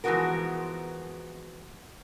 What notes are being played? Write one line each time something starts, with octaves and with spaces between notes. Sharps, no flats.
E3 F3 G#3 B3 F#4 A#4